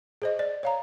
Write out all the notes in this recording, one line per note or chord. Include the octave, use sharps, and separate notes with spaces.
G#4 C5 D#5
D5
C#5 F5 A#5